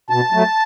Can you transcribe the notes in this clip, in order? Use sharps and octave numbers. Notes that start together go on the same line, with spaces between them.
B2 A5
F#3 A3